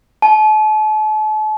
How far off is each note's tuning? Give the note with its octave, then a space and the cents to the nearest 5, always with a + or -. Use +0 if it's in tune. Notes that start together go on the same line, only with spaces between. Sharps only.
A5 -40